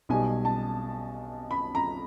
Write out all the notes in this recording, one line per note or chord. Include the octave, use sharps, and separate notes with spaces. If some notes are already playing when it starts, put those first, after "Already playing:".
B1 B2 G3 G#5
A5
B5
A#5